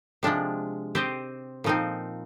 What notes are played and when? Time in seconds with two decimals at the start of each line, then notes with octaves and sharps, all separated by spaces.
0.23 C3 F3 G#3 D4
0.95 C4 G4 C5 D#5
1.64 A#2 F3 C4 D#4